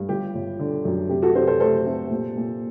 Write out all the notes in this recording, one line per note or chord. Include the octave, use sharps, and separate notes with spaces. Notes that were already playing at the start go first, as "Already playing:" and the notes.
Already playing: G2
G1 G4
G1
D3
F#2
C3 G4
F#4 A4
C3 A4 C5
A4 C5
A3 A4 C5
C3
A#2
A#2